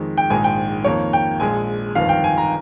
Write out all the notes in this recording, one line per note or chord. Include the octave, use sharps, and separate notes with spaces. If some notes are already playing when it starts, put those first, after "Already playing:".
Already playing: F2 D#3 G#3
G5
A#1 G#2 D#3 G#3 G#5
G5
F2 D#3 A#3 C#5
G5
A#1 A#2 G#3 G#5
G1 F2 D#3 F5
G5
G#5
A#5